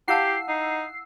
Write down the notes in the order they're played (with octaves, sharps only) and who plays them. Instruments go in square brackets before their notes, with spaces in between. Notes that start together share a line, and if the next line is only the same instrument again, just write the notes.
[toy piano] E4 F5 A5 [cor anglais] G4 [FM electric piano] F#5 E6 [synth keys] C7
[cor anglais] D#4